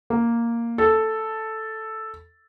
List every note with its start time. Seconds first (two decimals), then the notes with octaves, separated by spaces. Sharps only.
0.10 A#3
0.78 A4